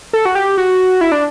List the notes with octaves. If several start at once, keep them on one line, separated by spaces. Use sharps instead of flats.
A4
F#4
G4
F#4
E4
D4